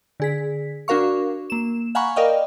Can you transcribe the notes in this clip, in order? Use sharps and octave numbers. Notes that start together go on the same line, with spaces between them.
D3 G#4 B6
D4 F#4 A#4 F5 C#6
A#3 E7
F5 F#5 G#5 A#5 B5 C#6
A#4 D5 D#5 F5 G5